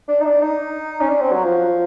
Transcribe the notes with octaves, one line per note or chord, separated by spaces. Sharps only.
D4
D#4
D4
D#4
C#4
D4
C4
F#3
F3